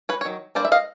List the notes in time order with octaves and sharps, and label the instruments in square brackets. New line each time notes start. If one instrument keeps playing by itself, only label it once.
[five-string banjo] B4 C#5
C#5
D#3 F#3
G3 A#3 D4 C5 D5
E5
D#5 F5